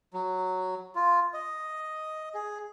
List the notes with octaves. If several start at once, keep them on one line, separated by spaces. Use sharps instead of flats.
F#3
F4
D#5
G#4